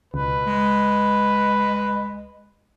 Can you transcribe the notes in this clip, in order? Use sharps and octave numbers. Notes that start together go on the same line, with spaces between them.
C#2 B2 B4
G#3